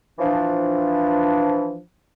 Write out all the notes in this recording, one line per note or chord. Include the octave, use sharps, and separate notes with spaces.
E3 F3 D4